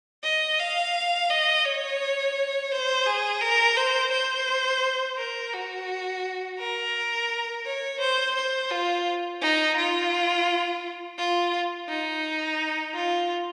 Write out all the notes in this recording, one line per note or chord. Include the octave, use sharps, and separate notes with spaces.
D#5
F5
D#5
C#5
C5
G#4
A#4
C5
C5
A#4
F#4
A#4
C#5
C5
C5
F4
D#4
F4
F4
D#4
F4